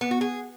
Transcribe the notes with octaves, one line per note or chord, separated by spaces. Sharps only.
B3
F#4
G#4